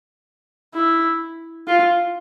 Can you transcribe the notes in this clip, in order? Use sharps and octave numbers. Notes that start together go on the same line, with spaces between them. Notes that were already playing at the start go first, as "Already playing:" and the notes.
E4
F4